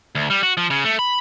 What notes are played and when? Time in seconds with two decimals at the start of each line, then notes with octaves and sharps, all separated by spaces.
0.15 D2
0.30 G3
0.43 F#4
0.57 F3
0.70 C#3
0.85 A3
0.99 B5